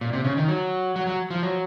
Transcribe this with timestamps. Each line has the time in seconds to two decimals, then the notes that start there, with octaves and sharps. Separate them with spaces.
0.01 A#2
0.13 C3
0.24 C#3
0.37 D#3
0.48 F#3
0.96 F#3
1.07 F#3
1.31 F3
1.43 F#3